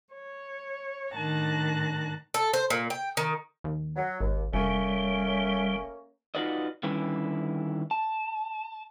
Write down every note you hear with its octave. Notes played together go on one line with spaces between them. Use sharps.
C#5
A2 D#3 D4 A5 F#6 A#6
A4
C5
A#2
G5
D#3
D#2
F#3
G#1 D#2
F1 G3 A3 A#3 C#4
D#4 F4 F#4 B4 D5 D#5
D3 D#3 G3 C#4 E4 B4
A5